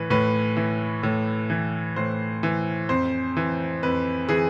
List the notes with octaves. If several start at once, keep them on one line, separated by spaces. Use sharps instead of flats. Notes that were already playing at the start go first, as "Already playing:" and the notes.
Already playing: A2 E3 B4
A2 B4
E3
A2
E3
A2 C5
E3
F2 C5
E3
F2 B4
E3 G#4